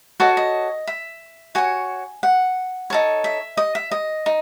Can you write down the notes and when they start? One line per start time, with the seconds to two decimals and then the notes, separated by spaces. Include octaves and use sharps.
0.20 F#4 A4 C#5 D#5
0.37 D#5
0.87 E5
1.55 F#4 C#5 G#5
2.23 F#5
2.90 D#4 A4 C#5
3.24 E5
3.57 D#5
3.75 E5
3.91 D#5
4.26 D#4